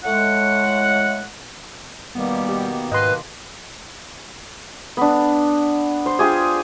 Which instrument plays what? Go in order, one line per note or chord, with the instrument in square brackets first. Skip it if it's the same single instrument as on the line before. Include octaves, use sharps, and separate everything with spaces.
[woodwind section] A2 G#3 F#5
[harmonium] B2 D#3 A#3 [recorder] G3 [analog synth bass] B3
[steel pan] G4
[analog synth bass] G#2 [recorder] B4 [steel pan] D#5 C6
[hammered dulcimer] B3 D4
C5
F4 G4 G#4